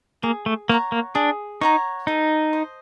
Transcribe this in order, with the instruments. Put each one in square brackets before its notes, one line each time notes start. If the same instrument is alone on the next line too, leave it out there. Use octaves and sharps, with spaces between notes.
[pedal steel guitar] A#3 [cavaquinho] G#4
[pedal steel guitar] A3
[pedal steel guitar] A#3 [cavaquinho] C#5 F#5 A#5
[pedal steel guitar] A#3
[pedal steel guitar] D4 [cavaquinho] G#4
[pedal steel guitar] D#4 [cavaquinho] C#5 F#5 A#5
[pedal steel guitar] D#4 [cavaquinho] A4
[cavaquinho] C5 D#5